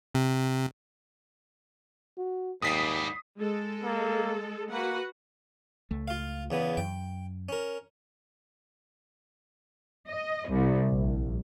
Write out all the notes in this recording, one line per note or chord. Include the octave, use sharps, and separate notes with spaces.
C3
F#4
D#2 G#2 G3 D#6 B6 C7
G#3 A4
A#3
A#3 F#4 B4 F#5
C#2 A3
F4 F5
E2 C#3 B3
F#2 G5
C#4 A#4
D#5
C2
A#1